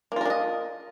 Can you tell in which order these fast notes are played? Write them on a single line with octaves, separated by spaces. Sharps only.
A#3 F4 A#4 D4 D#5